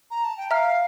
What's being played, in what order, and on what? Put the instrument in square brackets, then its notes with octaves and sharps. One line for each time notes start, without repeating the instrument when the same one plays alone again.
[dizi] A#5
A5
G5
[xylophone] E5 A#5 F6 [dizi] F5 G5